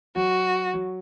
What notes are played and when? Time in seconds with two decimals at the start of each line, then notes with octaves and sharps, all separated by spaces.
0.16 F#3 F#4
0.74 F#3